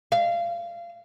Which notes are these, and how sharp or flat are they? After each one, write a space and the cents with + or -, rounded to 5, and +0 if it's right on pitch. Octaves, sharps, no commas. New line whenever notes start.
F5 -25